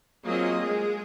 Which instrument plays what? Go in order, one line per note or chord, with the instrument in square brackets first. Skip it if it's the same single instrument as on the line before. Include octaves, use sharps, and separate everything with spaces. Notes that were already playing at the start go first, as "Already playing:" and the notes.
[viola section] F#3 A#3 C4 F4 G#4 D#5
G#3 G#4